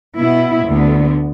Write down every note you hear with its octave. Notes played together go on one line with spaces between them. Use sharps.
B2 B3 E4
D2 D3 B3